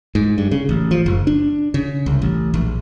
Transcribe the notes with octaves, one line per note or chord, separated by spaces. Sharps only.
G#2
G2
C#3
A1
F3
F#1
D4
C#3
C2
A1
A#1